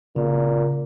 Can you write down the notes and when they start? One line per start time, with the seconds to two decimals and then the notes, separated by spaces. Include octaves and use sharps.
0.16 A#2 C#3